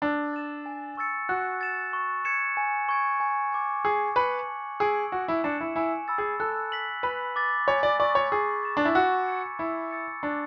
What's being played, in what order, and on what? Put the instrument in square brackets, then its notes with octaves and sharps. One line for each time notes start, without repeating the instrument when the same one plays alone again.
[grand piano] D4 [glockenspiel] E6
[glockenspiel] A6 E7
G#5
C#6 E6 A6 C#7
[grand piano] F#4 [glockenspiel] F#6
[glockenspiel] A6 E7
C#6
G#6 C#7 E7
G#5
C#6 G#6 D7
G#5
D6 G#6
[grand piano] G#4 [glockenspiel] D6
[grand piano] B4 [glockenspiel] F#6 C#7 F#7
[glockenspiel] A5
[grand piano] G#4 [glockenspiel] E6 G#6 D7 F#7
[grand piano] F#4 [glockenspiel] F#6
[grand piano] E4
[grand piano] D4 [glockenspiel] C#7 E7
[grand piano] E4
[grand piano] E4 [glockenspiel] G#5
[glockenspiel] B5 E6 A6
[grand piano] G#4
[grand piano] A4 [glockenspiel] F#6
[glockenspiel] B6 F#7
[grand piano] B4 [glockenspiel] B5
[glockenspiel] D6 A6
[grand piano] C#5 [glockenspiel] G#5
[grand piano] D5
[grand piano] D5 [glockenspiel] C#6 E6
[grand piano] C#5
[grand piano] G#4 [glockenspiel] D6
[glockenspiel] A6 E7
[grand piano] D4
E4
[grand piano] F#4 [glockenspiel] E6
[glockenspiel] G#6 C#7
[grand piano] E4 [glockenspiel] B5
[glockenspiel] E6 A6 C#7
[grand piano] D4 [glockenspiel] C#6